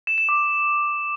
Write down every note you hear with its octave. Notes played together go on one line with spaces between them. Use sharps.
E7
E7
D6